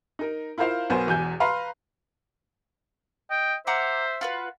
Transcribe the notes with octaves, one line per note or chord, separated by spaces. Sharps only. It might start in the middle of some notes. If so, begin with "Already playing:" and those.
D#4 A#4
E4 F4 A#4 C5 F5
B1 B2 B3 A#4 C5 G#5
E1 E2 G#5 G6
B4 F5 A#5 C6
D#5 G5
C5 E5 F#5 A#5 D6
F4 F#4 B4